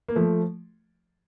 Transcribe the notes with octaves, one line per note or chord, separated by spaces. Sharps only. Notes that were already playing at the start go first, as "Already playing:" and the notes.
A#3
F3 A3